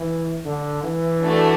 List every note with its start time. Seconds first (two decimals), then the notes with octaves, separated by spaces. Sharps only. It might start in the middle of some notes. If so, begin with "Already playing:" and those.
Already playing: E3
0.45 D3
0.83 E3
1.22 A3 D4 F#4 A4